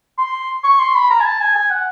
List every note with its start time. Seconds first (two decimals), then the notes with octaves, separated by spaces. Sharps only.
0.18 C6
0.64 C#6
0.79 C6
0.95 B5
1.10 A#5
1.20 G#5
1.25 A5
1.41 G#5
1.55 G#5
1.70 F#5